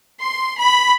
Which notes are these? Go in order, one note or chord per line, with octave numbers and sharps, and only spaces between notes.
C6
B5